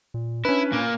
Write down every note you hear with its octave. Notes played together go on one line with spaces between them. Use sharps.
A#2
C#4 D4 E4 B4
A#2 A#3